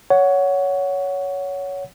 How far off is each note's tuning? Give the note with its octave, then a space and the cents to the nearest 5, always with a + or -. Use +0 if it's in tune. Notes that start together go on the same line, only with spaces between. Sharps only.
C#5 +15 F#5 +0